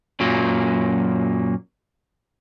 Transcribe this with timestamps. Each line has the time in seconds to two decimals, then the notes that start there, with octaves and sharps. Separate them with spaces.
0.20 F#2 A#2 F#3 A#3